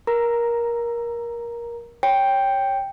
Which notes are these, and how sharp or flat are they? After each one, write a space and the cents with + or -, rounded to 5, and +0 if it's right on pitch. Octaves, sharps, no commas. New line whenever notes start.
A#4 +20 A#5 +0
C#5 +0 G5 +0